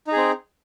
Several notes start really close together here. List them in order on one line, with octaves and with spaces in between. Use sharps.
D#4 G#4 C4